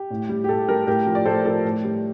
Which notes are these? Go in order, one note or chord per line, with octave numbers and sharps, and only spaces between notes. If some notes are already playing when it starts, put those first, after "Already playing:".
Already playing: G4
A2
G3
G4
A2 A4
G3 G4 A#4
A2 G4 A#4
F3
D5
A2 A4 C5
F3 A4
A2
G3